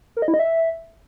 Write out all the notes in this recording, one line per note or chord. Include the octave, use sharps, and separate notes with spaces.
A#4
D#5
E4
D#5
E5